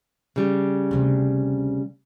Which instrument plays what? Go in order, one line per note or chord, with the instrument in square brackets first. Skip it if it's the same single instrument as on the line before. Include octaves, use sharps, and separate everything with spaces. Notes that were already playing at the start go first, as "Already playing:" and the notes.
[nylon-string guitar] C#3 G3
[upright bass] D2 C3